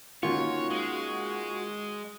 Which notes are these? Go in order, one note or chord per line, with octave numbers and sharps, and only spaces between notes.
D#3 A#3 C#4 F4 F#4 C#5
G#3